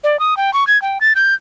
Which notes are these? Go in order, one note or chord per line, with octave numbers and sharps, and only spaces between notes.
D5
D#6
G5
C#6
G#6
G5
A6
G6